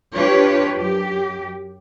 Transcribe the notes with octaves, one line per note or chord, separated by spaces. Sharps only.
D4 F4 G4 B4 C#5
F#2 G4